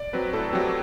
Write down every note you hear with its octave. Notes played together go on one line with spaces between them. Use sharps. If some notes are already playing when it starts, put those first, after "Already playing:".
Already playing: D5
F#3 C4 B4
A2 A4
F#3 C4 G4